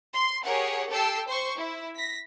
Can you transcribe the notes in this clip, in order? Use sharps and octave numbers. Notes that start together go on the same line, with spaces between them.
C6
G4 G#4 A#4 C#5 F#5
G4 A4 G5 A5 E6 C7
C5 C6 C#6
E4
A#6 B6